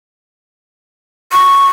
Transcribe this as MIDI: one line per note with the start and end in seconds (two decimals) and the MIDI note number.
1.32 1.66 85